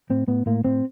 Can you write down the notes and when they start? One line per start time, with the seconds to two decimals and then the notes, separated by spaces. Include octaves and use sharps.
0.10 A2 C4
0.27 A2 B3
0.46 A2 A#3
0.64 A2 C4